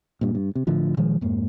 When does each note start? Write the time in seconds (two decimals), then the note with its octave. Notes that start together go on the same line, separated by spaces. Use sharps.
0.21 G2 A#2
0.35 G2
0.55 C3
0.67 A2 D3 F3
0.97 A#2 D#3 F3 G#3
1.21 F2 G#2 A#3